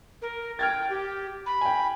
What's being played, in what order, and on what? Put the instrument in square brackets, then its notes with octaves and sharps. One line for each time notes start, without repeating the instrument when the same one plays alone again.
[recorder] A#4
[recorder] G5 [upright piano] F6 G#6 A6
[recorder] G4
B5
[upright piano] G5 G#5